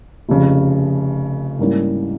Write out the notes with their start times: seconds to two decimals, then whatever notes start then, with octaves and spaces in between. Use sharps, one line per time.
0.29 F1 F2 C#3
1.59 G#2 G3 A#3 C#4 E4